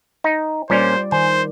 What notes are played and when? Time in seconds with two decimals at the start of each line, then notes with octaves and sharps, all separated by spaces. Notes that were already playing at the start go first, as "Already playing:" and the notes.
0.24 D#4
0.70 A#2 G3 C#4 F4 C5 D5
1.12 D#3 C5 G#5